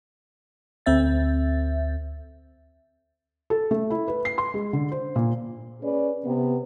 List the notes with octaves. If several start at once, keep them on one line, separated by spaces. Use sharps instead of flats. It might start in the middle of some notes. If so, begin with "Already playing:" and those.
D2 C4 E5 A6
A4
A3
E4
B4
C7
C6
G#3
D3
C5
A#2
C#4 G#4 B4 D5
C3 B3